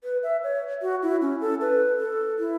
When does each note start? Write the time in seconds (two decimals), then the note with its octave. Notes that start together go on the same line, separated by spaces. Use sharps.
0.04 B4
0.23 E5
0.43 C#5
0.82 F#4
1.03 E4
1.22 C#4
1.41 A4
1.61 B4
1.99 A4
2.39 E4